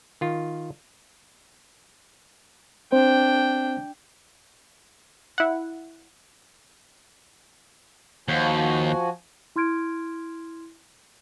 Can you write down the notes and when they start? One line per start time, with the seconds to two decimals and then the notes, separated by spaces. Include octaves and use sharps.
0.21 D#3 F4
2.92 C4 D4 C5 G5
5.38 E4 F#5
8.28 D#2 F3 F#4 G#5
9.56 E4 C6 F6 G#6 D7